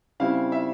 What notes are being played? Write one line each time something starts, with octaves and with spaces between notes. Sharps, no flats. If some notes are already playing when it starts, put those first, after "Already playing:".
C#3 G3 C4 E4 F5
E5